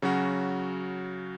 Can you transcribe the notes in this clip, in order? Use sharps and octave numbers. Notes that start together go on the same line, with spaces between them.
C#3 F#3 C#4 F#4